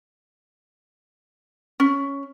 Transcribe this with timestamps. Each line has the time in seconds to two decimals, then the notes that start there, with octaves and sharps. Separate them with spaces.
1.80 C#4